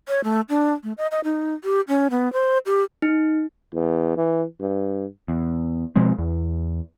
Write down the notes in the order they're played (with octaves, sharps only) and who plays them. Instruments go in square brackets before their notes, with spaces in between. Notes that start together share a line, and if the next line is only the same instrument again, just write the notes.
[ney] C#5
A3
D4
A3
D#5
D#5
D#4
G4
C#4
B3
C5
G4
[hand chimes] D#4
[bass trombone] E2
E3
G2
[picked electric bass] E2
B2 F3 G#3 C4
E2